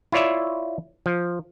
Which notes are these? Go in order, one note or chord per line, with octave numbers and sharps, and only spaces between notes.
E4 F4 C#5 D5 E5
F3